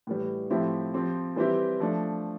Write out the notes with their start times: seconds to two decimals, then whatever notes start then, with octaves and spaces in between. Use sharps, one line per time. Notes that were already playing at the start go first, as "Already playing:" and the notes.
0.07 A2 E3 G3
0.50 A2 F3 C4 E4 G4
0.94 F3 C4 G4
1.36 E3 G3 C4 E4 G4
1.80 F3 A3 D4